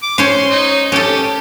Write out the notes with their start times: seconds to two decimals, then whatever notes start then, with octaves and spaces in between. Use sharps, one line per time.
0.02 D6
0.18 C#4 C5 C#5 C6
0.50 D#4
0.92 C#4 G4 A4